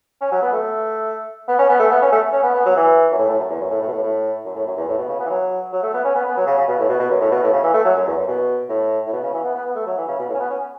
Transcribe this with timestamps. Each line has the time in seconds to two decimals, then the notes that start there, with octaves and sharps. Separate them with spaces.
0.21 C#4
0.32 F#3
0.42 B3
0.53 A3
1.48 B3
1.59 C#4
1.69 B3
1.79 A3
1.91 B3
2.02 C#4
2.12 A3
2.33 C#4
2.43 B3
2.54 B3
2.65 F#3
2.76 E3
3.11 F#2
3.19 A2
3.29 A2
3.39 F#2
3.50 E2
3.61 F#2
3.70 A2
3.81 A2
3.88 B2
3.92 A2
4.03 A2
4.45 F#2
4.55 A2
4.67 F#2
4.77 E2
4.88 A2
4.98 B2
5.09 C#3
5.20 B3
5.26 E3
5.30 F#3
5.73 F#3
5.83 A3
5.94 B3
6.04 C#4
6.16 B3
6.26 B3
6.37 F#3
6.46 C#3
6.58 C#3
6.68 B2
6.79 A2
6.89 B2
7.00 B2
7.11 F#2
7.21 A2
7.31 B2
7.43 A2
7.53 C#3
7.63 E3
7.74 A3
7.85 F#3
7.96 F#2
8.07 E2
8.17 F#2
8.28 B2
8.69 A2
9.07 A2
9.13 B2
9.23 C#3
9.33 E3
9.44 B3
9.55 B3
9.65 B3
9.75 A3
9.86 F#3
9.97 E3
10.08 C#3
10.19 B2
10.29 A2
10.34 C#4
10.40 B3
10.50 C#4